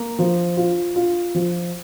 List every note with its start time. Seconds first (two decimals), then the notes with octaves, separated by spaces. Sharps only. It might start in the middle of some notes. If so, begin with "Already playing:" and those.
Already playing: A#3
0.19 F3
0.57 F4
0.96 F4
1.35 F3